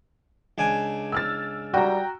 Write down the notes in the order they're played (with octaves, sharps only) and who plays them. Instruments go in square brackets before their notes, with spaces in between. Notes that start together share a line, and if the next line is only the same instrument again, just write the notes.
[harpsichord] C#2 D4 G#5
[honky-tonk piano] E6 F6 A6
[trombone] G3 [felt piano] F#4 [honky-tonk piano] G5 A#5